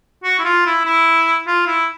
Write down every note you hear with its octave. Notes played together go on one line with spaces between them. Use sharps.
F#4
E4
F4
E4
E4
F4
E4